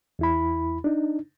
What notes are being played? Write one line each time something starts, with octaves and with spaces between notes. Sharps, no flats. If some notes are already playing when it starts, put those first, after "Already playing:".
E2 E4 B5
D4 D#4